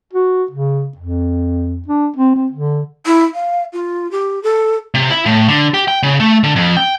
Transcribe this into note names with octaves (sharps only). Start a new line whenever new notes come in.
F#4
C#3
F2
D4
C4
C4
D3
E4
F5
F4
G4
A4
C3
E4
A2
D3
G4
G5
C#3
A3
D3
F2
G5